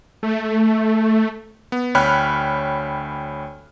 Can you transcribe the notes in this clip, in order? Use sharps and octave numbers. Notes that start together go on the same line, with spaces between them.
A3
B3
D2 C#5 G5 B5 F6 F#6